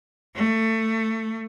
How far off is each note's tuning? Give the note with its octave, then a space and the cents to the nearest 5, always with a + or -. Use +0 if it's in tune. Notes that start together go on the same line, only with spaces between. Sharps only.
A3 +20